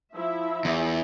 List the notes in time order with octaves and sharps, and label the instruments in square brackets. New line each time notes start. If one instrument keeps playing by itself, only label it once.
[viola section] F3 E4 E5
[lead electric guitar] E2